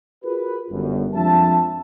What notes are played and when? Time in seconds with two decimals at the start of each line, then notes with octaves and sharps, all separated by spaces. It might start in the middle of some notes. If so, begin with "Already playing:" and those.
0.24 F4 F#4 G#4 A#4 B4
0.71 G1 F#2
1.15 F2 F3 G#3 D4 E5 A5